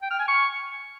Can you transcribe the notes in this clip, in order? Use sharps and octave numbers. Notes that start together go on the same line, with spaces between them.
G5
F6
G#5
C#6